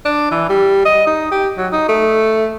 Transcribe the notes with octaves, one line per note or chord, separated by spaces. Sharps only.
D4
E3
G3
D#5
D#4
G4
F#3
D#4
A3